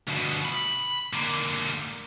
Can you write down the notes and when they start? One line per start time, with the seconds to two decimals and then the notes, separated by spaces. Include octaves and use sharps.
0.08 D2 B2
0.45 B5
1.13 D3 A#3